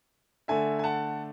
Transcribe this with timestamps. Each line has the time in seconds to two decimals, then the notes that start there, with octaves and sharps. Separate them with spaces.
0.48 D3 A3 E5 G#5
0.79 G#5
0.84 F#5 A5